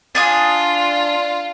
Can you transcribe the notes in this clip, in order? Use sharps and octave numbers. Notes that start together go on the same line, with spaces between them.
D4 F4 G#5 D#6